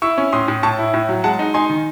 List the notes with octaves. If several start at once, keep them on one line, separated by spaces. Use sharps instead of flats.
E4 C#6 E6
C#4
A2 C6 D#6
A2
A2 A5 C#6
E4
A2
F#3
G#3 F#5 A5
D#4
D#4 G#5 C6
D#3